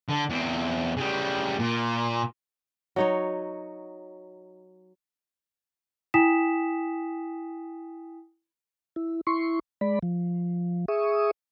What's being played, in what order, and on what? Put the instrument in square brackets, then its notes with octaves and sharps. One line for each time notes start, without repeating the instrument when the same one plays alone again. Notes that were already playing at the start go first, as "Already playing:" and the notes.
[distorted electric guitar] D3
E2 C4
C#3 G3
A#2
[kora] F#3 D#4 C#5
[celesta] E4 G5 G#5 D#6 B6 E7
[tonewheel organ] E4
E4 C6 C#6
G#3 D5 B5
F3
G#4 E5 C#6 D#6